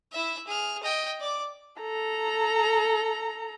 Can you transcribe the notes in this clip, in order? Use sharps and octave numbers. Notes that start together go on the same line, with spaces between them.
E4 E5
G#4 F6
D#5 G5
D5 D6
A4 A#5